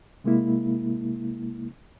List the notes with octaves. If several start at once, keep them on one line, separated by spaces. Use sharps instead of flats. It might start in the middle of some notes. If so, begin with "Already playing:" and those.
C3 G#3 A#3 E4